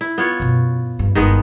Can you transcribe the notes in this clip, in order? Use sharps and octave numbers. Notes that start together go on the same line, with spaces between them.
E4
B3 F4 C#5
F#2 B2
G2
G1 D#3 G#3 B3 E4